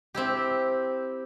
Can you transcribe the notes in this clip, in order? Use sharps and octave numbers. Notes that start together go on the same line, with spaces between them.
C4 E4 G4